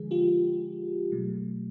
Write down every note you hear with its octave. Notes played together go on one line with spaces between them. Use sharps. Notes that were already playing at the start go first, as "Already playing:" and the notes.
Already playing: D3 F3 G#3 G#4
F4 G4
B2 F#3 A3